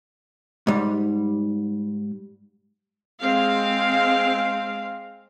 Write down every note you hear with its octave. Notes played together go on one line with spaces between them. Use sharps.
G#2 G3
G#3 C4 F5